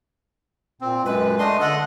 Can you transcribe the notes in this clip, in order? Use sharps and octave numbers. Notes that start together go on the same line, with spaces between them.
A#2 C4
F#2 G#3 B4
A3 D4 D#5 C6
D3 A4 D#5 F#5